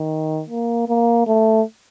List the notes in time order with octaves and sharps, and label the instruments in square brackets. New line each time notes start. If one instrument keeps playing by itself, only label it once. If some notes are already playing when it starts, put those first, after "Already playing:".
Already playing: [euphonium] D#3
A#3
A#3
A3